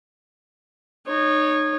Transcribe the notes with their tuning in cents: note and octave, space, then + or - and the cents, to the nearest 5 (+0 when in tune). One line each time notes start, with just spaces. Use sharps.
D#4 -25 C#5 -10